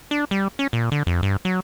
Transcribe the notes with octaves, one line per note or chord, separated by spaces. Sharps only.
D4
G3
C#4
A#2
D3
F2
G2
F#3